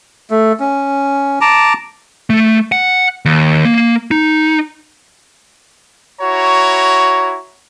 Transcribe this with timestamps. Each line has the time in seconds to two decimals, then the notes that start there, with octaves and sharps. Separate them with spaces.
0.31 A3
0.60 C#4
1.41 A5 A#5 D6
2.30 A3
2.72 F#5
3.25 D#2
3.65 A#3
4.11 D#4
6.21 E4 F#4 C#5 A#5